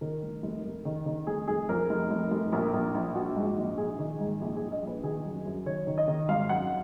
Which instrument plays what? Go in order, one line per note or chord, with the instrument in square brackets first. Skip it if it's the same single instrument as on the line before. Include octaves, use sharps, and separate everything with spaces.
[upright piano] D#3 A#4
F1
F1
F1
D#3
D#3
F1 G#4
F1 G#4
F2 A#4
F1
F1
F1
A#1 A#4
A#1
A#1
A#1 F#4
G#2
A#1
A#1 G#4
D#3
G#2
A#1 G#4
G#4
A#1
D#5
A#1 B4
D#3 G#4
F#2
F#2
D#3 C#5
D#3
D#5
D#3
G#1 F5
F#2 F#5